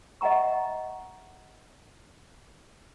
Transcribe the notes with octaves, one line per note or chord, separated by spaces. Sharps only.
D#5 E5 F#5 A#5 C#6